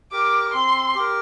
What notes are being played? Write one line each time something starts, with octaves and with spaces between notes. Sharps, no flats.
G4 A#4 D6
C4 C6
G4 A#4